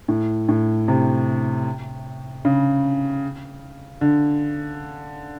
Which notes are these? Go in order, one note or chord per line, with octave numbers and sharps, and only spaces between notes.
A2
A2
C3
C#3
D3